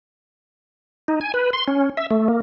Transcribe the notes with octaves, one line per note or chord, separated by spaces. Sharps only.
D#4
G#5
B4
C6
C#4
E5
A3
A#3